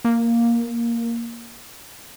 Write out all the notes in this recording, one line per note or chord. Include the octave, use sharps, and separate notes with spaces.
A#3